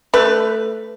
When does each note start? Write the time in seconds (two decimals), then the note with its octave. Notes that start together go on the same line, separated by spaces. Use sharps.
0.14 A3 B4